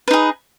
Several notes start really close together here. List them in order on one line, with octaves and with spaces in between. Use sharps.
B4 D#4 G#4